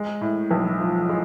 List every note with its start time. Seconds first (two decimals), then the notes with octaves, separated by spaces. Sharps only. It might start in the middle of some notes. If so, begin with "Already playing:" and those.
Already playing: G#3
0.21 A2
0.51 B1
0.80 F3
1.09 G#3